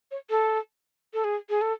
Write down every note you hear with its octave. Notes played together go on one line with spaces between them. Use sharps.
C#5
A4
A4
G#4
G#4
A4